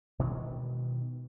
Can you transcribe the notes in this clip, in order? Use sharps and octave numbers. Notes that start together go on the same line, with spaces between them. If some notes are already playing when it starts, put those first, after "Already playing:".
B2 D#3 E3 G#3